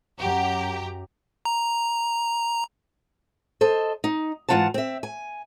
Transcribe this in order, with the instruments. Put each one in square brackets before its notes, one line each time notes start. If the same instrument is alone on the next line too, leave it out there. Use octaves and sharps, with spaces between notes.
[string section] F#2 G4 A#5 [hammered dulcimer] F#3
[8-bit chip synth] A#5
[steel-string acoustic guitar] A4 C5 D#5
D#4
G#2 E3 E4 F4 F#5 A5
C4 E5
G#5